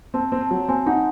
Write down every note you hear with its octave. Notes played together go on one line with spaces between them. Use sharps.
C4 A5
C4
A5
F#3
C4 G#5
D#4 F#5